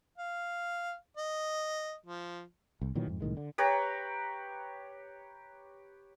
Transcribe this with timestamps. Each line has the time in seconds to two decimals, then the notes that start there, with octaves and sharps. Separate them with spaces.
0.18 F5
1.17 D#5
2.06 F3
2.82 C2
2.95 A#2 D#3 E3 F#3
3.07 F2 G#2
3.20 C2 A2 D#3 G#3
3.37 D3
3.58 G4 B4 C#5 A#5